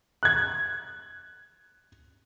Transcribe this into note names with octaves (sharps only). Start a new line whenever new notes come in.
F#6 G#6